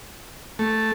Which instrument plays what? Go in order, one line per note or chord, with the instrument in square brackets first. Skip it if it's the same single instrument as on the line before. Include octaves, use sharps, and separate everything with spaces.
[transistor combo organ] A3